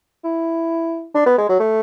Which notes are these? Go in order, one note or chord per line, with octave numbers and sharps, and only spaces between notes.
E4
D4
B3
G#3
F#3
A3